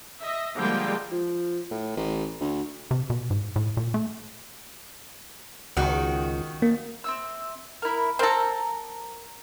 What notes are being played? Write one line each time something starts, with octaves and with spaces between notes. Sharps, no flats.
D#5 E5
D3 F3 G3 G#3 A#3 G5
F3
A2
A1
D2
C3
B2
G#2
A2
A#2
A3
C#2 D#3 F#4
A#3
C4 E5 E6
E4 A#4
C4 A4 A#4 A#5